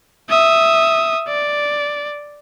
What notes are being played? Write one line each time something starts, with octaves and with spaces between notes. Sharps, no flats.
E5 D#6
D5